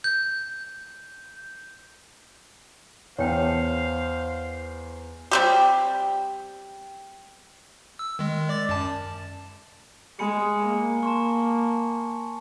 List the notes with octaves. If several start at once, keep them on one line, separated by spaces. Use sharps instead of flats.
G6
E2 C5 C#5 F5 G5 A5
G3 C4 G4
E6
D#3 G#3
D5 D6 A6
F#2 A5
G#3 G#5 B5 C#7
A#3
A5 C6 C#6